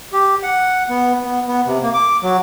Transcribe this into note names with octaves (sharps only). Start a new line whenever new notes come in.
G4
F#5
B3
B3
B3
C3
A#3
D6
F#3